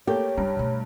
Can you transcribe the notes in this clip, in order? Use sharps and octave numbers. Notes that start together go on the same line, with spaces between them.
A3 A#3 G4 C#5
G2 D4 A#5
B2 A3